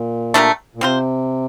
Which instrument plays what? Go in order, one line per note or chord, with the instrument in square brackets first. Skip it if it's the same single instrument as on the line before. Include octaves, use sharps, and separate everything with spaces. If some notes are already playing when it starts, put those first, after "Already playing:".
Already playing: [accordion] A#2
[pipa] A3 D4 G4 A#4
[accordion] A#2
[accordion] C3 [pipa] C4 F4 C5